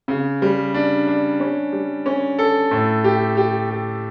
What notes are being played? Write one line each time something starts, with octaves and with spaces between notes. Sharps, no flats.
C#3
G3
D4
D4
C#4
G3
C#4
A4
A2
G4
G4
G4